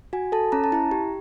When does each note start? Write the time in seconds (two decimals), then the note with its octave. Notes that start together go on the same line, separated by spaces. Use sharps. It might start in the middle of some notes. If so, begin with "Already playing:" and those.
0.13 F#4 G#5
0.32 A4 A5
0.52 C#4 A#5
0.64 A5
0.72 E4 A#5
0.91 G4